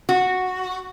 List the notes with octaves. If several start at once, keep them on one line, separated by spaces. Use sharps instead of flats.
F#4